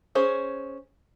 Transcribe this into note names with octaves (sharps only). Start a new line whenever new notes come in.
C#4 G#4 C5